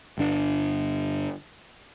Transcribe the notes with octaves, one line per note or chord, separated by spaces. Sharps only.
G1 D4